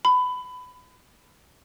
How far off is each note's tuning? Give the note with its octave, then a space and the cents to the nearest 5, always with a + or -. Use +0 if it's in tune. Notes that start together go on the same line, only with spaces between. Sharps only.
B5 +20